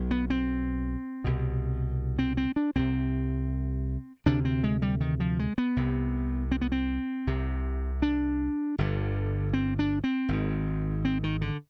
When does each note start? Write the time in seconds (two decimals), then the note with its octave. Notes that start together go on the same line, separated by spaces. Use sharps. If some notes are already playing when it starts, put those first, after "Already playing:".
Already playing: B1 B2
0.11 B3
0.30 C4
1.24 C2 B2
2.19 C4
2.37 C4
2.56 D4
2.75 C2 C3 C4
4.26 D2 C3 D4
4.45 C4
4.64 G#3
4.82 G3
5.01 D#3
5.20 F3
5.39 G#3
5.58 B3
5.76 C2 C3
6.52 C4
6.61 B3
6.72 C4
7.27 C2 C3
8.02 D4
8.78 G1 G2 D3
9.53 C4
9.79 D4
10.04 C4
10.29 G#1 G#2
11.05 C4
11.24 D#3
11.41 D3